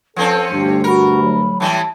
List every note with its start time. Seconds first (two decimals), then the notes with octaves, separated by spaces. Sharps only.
0.16 F3 C4 C#4 A4 B4
0.52 D2 G2 D4 G4
0.84 F#4 A#4 B5
1.23 F#3
1.60 A2 E3 G3 A5